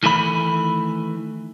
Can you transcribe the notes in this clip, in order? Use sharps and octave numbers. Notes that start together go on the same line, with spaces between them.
D#3 E3 A3 C5 B5